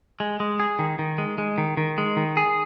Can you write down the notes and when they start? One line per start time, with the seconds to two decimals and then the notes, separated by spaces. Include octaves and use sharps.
0.20 G#3
0.40 G#3
0.60 G#4
0.79 D#3
0.99 D#3
1.18 G#3
1.38 G#3
1.58 D#3
1.77 D#3
1.98 G#3
2.17 D#3
2.37 G#4